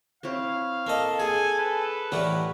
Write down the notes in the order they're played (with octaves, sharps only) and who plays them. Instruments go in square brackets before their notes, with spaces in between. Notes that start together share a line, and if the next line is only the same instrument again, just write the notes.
[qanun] C4 E4 C#5 [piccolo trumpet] F5
[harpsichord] A#3 D#5 [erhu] A4
[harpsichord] G#4 [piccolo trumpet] G#5
[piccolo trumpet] B4
[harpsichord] A2 E3 G3 [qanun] A#4 C#5 F#5